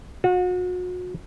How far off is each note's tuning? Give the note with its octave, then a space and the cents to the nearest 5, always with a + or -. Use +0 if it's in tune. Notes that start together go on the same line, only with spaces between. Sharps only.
F#4 -35